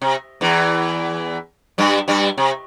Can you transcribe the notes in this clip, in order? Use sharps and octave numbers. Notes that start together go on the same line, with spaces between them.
C3
E2 E3
G2 G3
G2 G3
C3